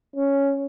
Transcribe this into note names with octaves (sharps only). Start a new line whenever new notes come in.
C#4